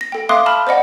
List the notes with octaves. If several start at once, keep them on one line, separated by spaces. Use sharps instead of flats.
A#6
A4 G5
E5 F5 C6 D6 D#6 F#6
A5 B5 F6
C5 D5 D#5 F#5